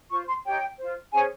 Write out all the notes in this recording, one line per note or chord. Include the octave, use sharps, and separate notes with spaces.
F4 C5 C#6
C6
D#4 G4 C#5 G5
F4 C5
C#4 G#4 C5 G#5